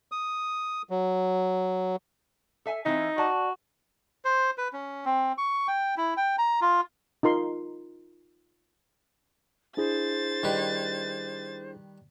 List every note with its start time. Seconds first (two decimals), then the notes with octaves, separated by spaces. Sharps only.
0.12 D#6
0.90 F#3
2.66 A4 E5 G#5
2.86 E3 C4 D#4 E4
3.18 F#4 D5 A5
4.25 C5
4.58 B4
4.73 C#4
5.05 C4
5.38 C#6
5.68 G5
5.97 E4
6.17 G5
6.38 A#5
6.61 F4
7.23 D#4 F4 A#4 C6
9.77 D4 E4 G#4 C5 A6
10.43 D#3 G3 B4